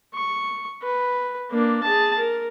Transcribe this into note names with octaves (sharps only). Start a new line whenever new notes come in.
C#6
B4
A#3 D4
G#4 A5
A#4